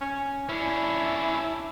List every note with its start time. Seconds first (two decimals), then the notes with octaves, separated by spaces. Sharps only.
0.01 C#4
0.49 C#4 D4 E4